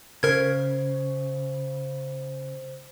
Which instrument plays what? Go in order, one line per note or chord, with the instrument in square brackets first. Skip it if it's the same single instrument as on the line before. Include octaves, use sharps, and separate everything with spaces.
[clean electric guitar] C#3 [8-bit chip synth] A#4 G#6 [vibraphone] C5